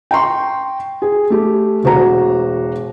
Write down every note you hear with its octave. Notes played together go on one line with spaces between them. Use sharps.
G5 A#5 C6 C#6
G#4
A3 G4
E1 F#4 C5 A#5